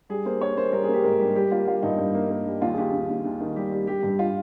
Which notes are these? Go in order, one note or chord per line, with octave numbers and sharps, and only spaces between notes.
G3 G#4
A#3 C5
A#3 C#5
A#3 C5
G3 A#4
G#4
A#3 G4
G#2 A#4
G3 G4
G3 G4
A#3 F4
G3 F4
G2 D#4
G2
A#3
A#3
G3
D#2 F4
G#4
D#2 G4
D#2
D#2
D#2
D#3
G3 G4
G3
G3 G4
G2
F4